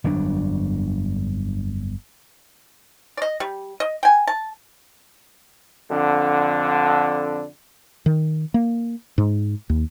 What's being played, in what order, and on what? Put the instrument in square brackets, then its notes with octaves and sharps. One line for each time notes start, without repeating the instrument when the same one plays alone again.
[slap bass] G1 F2 F#3 D4
[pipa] D5 D#5
G3
D#5
G5 G#5
A5
[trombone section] F2 D3
[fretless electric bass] D#3
A#3
G#2
D#2